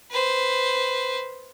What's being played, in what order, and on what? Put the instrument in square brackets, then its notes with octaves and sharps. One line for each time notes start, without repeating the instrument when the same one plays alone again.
[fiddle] B4 C5